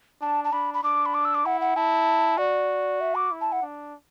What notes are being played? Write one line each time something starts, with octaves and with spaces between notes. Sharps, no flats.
D4 A5
A5
D4 B5
B5
D4 D6
B5
D6
E6
D6
E4 F#5
F#5
E4 A5
F#4 D5
E5
D6
E4
A5
F#5
D4